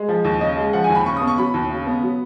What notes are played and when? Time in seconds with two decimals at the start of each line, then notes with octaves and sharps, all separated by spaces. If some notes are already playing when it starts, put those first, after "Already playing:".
Already playing: G#3
0.09 F3
0.25 D#2
0.41 C#3 D#5
0.57 G#3
0.73 F3 F#5
0.84 G#5
0.90 D#2
0.95 B5
1.06 C#3 C#6
1.17 D#6
1.22 B3
1.27 C#6
1.38 F#3 B5
1.54 D#2
1.70 C#3
1.87 B3
2.03 F#3